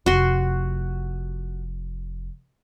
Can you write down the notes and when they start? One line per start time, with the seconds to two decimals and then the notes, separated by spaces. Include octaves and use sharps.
0.06 F1 F#4 C6